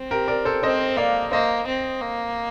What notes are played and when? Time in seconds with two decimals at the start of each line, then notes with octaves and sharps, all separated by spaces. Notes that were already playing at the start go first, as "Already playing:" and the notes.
Already playing: C4
0.11 G4 A#4
0.28 A#4 D5
0.45 A4 C5
0.63 C4 C5 D#5
0.97 A#3 D5 F5
1.32 A#3 C5 D#5
1.67 C4
2.01 A#3